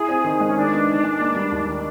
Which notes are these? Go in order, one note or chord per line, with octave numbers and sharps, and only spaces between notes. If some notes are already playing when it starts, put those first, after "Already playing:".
Already playing: E4 G#4
C4
D#3
G#3
C#4
D#3 D4
B3
D#3
G#3
A#3
G3
D#2
D#3